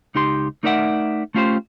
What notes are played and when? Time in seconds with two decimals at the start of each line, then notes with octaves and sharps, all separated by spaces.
0.15 C#2 D#4 G4 C6
0.63 A3 D#4 A#4 D5 E5 F#5
1.35 A3 C#4 F4 G4 B4 C5